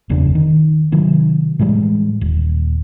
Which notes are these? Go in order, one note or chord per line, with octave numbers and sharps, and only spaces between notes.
F#1 E2 C#3 D4
D#3
C3 D#3 F#3
A2 E3 G3 G#3
D#1